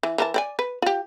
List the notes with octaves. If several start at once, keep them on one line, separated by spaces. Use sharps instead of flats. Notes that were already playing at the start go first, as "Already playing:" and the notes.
E3
E3 A#4 A5
C4 D5 G#5
B4
F4 G4